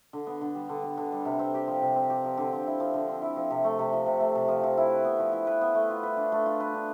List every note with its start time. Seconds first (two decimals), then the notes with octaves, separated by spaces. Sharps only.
0.13 D3
0.27 B3
0.41 D3
0.55 G3
0.69 D3
0.83 B3
0.97 D3
1.12 G3
1.25 C3
1.39 C4
1.54 G4
1.67 F3
1.82 C3
1.96 C4
2.10 G4
2.25 F3
2.37 D3
2.52 C4
2.67 E4
2.80 F3
2.94 D3
3.09 C4
3.22 E4
3.36 F3
3.50 C3
3.64 A3
3.79 C3
3.93 F3
4.06 C3
4.20 A3
4.35 C3
4.48 F3
4.63 F3
4.77 E4
4.90 B4
5.05 B3
5.20 F3
5.33 E4
5.47 B4
5.61 B3
5.75 A3
5.90 F4
6.03 B4
6.17 D4
6.32 A3
6.46 F4
6.60 B4
6.74 D4